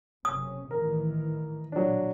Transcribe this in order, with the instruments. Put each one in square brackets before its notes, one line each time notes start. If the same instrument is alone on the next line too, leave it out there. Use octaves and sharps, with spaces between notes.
[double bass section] F#1 C3 C#4 [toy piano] D#6
[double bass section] A1 D#3 E3 [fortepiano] A#4
[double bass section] A#1 B2 [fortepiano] F#3 D4